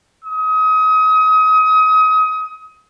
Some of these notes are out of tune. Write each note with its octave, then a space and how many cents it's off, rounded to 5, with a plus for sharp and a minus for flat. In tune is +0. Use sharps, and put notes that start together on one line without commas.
D#6 +30